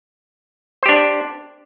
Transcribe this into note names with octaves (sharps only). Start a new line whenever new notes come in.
D4 G4 C5